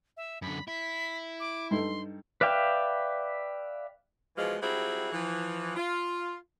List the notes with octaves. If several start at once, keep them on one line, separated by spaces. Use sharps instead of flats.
E5
F#2 D3 B5
E4 B6
D6
G2 D#4 A4 C6
B4 D5 E5 F5 G5
B2 E3 F3 G#3
F#3 G3 C4 E4 F4 G#4
E3 F3
F4